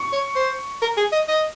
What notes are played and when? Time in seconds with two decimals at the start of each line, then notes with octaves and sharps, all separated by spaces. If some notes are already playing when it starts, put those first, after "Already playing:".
Already playing: C#6
0.13 C#5
0.36 C5
0.82 A#4
0.97 G#4
1.13 D#5
1.28 D#5